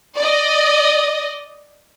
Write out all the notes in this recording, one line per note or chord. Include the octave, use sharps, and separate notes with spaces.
D5 D#5